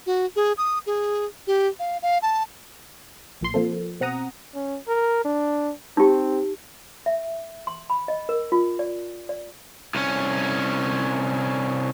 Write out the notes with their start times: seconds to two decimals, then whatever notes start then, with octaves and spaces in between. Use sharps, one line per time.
0.06 F#4
0.36 G#4
0.58 D#6
0.86 G#4
1.47 G4
1.79 F5
2.02 F5
2.22 A5
3.41 A#1 A#2 C6
3.54 F3 A#3 C4 A4
4.00 B2 C4 F#5 A#5 D#6
4.54 C#4
4.88 A#4
5.25 D4
5.97 C4 D#4 G4
7.06 E5
7.67 C6
7.90 B5
8.08 D#5
8.29 A#4
8.52 F4
8.79 D5
9.29 D5
9.95 C2 C#4